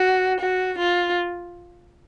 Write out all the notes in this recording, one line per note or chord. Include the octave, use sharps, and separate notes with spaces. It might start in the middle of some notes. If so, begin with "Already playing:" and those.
Already playing: F#4
F#4
F4